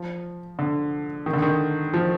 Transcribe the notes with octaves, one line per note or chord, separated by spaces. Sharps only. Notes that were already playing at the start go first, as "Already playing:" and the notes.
Already playing: F3
D3
D#3
D3
D#3
F3